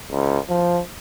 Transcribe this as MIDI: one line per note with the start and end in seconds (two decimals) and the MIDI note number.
0.12 0.39 37
0.49 0.80 53